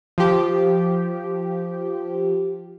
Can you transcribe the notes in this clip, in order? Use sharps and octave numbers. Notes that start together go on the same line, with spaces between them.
F3 G4